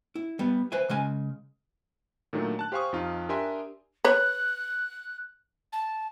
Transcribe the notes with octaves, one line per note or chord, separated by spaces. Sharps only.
E4
G3 B3
B4 C5 E5 G#5
C#3 G#3 G#5
A#2 D#3 F#3 A3 D4
A5 F#6
G4 C5 F5 G#5 C#6 D#6
F2 D#4 F4
D4 G4 A#4 E5 G#5 C6
B4 C#5 F#6
A5